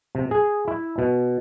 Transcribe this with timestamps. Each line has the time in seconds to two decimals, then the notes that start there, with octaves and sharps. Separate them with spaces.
0.15 C3
0.31 G#4
0.68 E4
0.98 B2